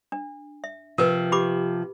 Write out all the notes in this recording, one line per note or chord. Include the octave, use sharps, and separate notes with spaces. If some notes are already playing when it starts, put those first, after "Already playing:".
D4
E5
C3 F3 A#4 B4
G4 B5 D6